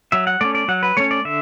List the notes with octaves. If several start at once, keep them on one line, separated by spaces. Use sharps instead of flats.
F#3 E5
F#5
A3 C#4 D5
D5
F#3 F#5
B4
A3 C#4 C#5
D5
D3 E5